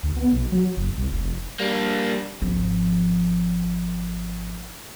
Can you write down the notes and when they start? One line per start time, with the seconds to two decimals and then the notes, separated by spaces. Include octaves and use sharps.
0.03 D2
0.16 B3
0.33 B1
0.52 F#3
0.77 F#1
0.98 C2
1.12 F1
1.60 G3 A#3 D4
2.42 G#1 F3